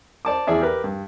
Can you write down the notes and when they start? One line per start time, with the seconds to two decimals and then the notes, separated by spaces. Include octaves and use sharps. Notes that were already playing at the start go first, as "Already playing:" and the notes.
0.25 C5 D5 A5 D6
0.47 E2 E3 G#4 D5 E5
0.61 G4 A#4 B4
0.84 G2